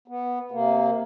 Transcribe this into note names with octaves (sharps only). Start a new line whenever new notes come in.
B3
C3 A#3